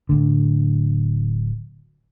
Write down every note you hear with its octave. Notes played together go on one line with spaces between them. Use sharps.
D1 D2 D3